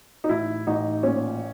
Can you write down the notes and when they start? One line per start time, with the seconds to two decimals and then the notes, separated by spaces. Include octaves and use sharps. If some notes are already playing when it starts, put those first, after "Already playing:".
0.24 D#4
0.29 A1 E4
0.67 A1 D#4
1.03 A#2 C#4